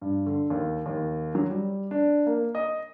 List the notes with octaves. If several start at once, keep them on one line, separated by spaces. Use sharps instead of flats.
G2
D3
D#2
D#2
F#3
G3
D4
A#3
D#5